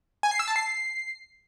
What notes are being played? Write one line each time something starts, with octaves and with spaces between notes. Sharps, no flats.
G#5
C7
E6
A5
C7